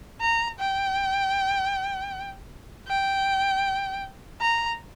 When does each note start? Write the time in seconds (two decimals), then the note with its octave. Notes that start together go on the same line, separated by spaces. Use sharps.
0.21 A#5
0.59 G5
2.88 G5
4.41 A#5